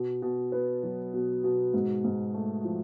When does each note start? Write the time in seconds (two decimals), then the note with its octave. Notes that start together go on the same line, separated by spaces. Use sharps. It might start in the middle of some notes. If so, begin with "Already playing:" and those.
Already playing: B2
0.22 B2
0.52 B3
0.83 F#3
1.14 B2
1.44 B2
1.74 G#2
2.04 G#2
2.34 A3
2.64 F3